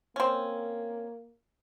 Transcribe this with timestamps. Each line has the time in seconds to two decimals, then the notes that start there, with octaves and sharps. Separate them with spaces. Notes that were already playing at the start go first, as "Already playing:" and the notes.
0.16 A#3 C4 C#4